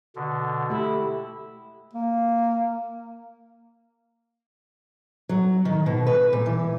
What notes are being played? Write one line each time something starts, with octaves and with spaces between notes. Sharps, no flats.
B2 D3
A3 E4 G4
A#3
F#3
D#3
B2
B4
A#2
E3